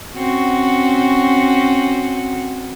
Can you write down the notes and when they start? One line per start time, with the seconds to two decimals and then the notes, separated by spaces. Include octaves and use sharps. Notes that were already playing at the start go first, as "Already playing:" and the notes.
0.17 C4 C#4 F#4